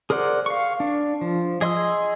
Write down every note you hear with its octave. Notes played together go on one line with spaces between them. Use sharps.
G#4 A#4 C5 D5 F#5
F5 C#6
D4
F3
G#4 D#5 C6 D#6 E6